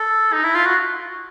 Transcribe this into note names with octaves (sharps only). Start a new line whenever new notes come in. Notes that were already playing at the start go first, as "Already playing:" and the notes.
Already playing: A4
D#4
E4
F4
F#4